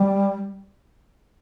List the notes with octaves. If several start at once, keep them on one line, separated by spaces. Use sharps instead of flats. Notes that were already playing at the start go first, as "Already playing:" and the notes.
Already playing: G3